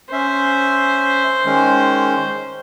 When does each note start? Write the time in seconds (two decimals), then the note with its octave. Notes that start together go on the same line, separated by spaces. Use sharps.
0.12 C#4 C5 E5
1.45 D#3 G#3 C#4